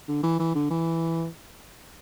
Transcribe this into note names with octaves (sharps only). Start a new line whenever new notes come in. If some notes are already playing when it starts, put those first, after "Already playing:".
D3
E3
E3
D3
E3